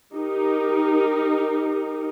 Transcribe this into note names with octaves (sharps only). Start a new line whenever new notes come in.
D#4 G4 A#4